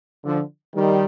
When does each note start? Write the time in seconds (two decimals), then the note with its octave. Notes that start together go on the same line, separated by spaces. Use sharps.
0.25 D3 F3
0.75 D#3 G3